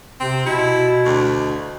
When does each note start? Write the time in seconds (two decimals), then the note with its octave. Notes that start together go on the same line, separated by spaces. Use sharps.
0.20 C3 C4
0.46 B2 E4
1.05 D2